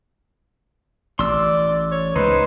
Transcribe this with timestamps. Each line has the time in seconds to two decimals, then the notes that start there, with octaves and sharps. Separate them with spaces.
1.19 A1 D5 C6 E6
1.91 C#5
2.16 C#2 G#3 D#4 B4 C5 C6